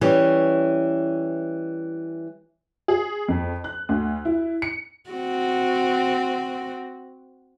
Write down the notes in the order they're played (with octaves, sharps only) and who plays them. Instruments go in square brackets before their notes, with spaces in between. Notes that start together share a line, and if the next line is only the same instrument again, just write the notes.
[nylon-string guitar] E3 G3 C#4
[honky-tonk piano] G#4
F2
F#6
D2
E4
C#7
[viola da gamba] C4 F#4